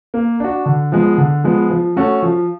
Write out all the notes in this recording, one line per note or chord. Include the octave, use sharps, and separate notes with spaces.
A#3
D4 F#4
D3
F3 G#3 B3
D3
F3 G#3 B3
F3
A3 C#4 F#4 A4
F3